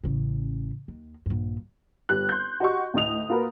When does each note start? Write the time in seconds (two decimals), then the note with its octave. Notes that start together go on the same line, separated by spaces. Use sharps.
0.04 A1 C#3
0.88 D#2
1.26 A#1 G2
2.09 G1 G4 F#6
2.29 C6 G6
2.60 F#4 G4 D#5 C6 C#6
2.94 D2 A2 D#5 D#6 F7
3.29 A#3 F4 F#4 A#4 B4